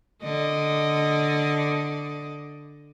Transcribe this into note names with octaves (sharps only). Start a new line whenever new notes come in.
D3 D5 D#5